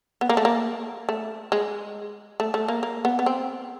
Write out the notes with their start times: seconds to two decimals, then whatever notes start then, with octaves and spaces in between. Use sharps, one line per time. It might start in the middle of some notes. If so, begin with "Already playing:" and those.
0.21 B3
0.29 A#3
0.37 A3
0.45 A#3
1.09 A3
1.52 G#3
2.40 A3
2.54 A3
2.68 A#3
2.83 A#3
3.05 B3
3.19 B3
3.26 C4